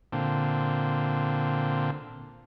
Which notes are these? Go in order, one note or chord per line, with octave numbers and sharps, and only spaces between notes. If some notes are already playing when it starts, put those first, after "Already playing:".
A#2 D3 C4